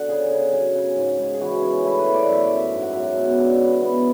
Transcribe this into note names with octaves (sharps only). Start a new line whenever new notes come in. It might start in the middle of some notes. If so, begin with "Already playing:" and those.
Already playing: D3 F#5
C#3 G#4
C#3
F#3 G#4
C#3
G#2
G#2
G#4
E3 F#4
C#4
A3 E4
B4
E3
D5
F#2 E5
E5
F#2
E5
G#2
F#5
F#3 E5
F#5
B2
D4
E3
B3